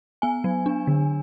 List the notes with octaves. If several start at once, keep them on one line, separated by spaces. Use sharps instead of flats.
B3 G#5
F#3
D4
D3